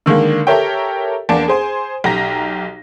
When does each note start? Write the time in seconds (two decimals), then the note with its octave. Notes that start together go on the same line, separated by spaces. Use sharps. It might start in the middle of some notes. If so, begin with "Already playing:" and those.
0.06 D3 D#3 G#3 A#3
0.47 G4 A4 A#4 C#5 E5 G5
1.29 E2 A#3 D4 A5 D7
1.48 G#4 C5 G#5
2.04 B1 G4 A#5 A#6 B6